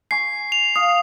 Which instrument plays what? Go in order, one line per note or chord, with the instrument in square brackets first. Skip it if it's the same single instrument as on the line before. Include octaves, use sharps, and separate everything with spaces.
[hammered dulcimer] G#5 C#6 [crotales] C7
[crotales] F7
[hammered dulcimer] F5 [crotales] D#6